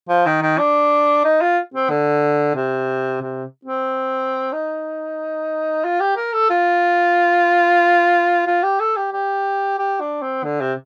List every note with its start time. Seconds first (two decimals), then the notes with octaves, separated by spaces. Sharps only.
0.09 F3
0.26 D#3
0.42 D#3
0.58 D4
1.24 D#4
1.41 F4
1.74 C4
1.90 D3
2.55 C3
3.21 C3
3.65 C4
4.53 D#4
5.84 F4
6.00 G4
6.17 A#4
6.33 A4
6.50 F4
8.47 F4
8.63 G4
8.80 A4
8.96 G4
9.13 G4
9.79 G4
10.00 D4
10.22 C4
10.44 D3
10.61 C3